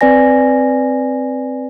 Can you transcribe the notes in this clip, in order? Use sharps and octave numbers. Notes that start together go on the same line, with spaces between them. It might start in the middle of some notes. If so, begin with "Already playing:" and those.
C4 B4 D5 G#5 A#6